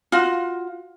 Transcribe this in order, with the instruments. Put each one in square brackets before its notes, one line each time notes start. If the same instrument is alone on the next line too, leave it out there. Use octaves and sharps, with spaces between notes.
[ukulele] F4 F#4